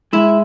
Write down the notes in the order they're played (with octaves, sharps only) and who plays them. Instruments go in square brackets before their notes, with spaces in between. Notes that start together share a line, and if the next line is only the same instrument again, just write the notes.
[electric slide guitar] G#3 [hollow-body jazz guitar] E4